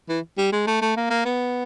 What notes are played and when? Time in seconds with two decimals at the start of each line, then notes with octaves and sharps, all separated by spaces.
0.09 E3
0.38 G3
0.52 G#3
0.67 A3
0.82 A3
0.97 A#3
1.10 A#3
1.25 B3